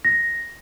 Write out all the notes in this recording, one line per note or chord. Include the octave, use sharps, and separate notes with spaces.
A#6